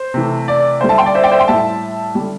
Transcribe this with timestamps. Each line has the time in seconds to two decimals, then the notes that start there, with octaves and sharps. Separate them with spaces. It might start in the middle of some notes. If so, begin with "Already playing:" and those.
Already playing: C5
0.14 C3 E3 A3
0.48 D5
0.81 D3 G3 C5
0.89 E5 A5
0.98 G5 C6
1.06 D5
1.15 C5 E5
1.23 D5 G5
1.32 C5 E5
1.39 G5 C6
1.48 A2 G3 E5 A5
2.15 D3 G3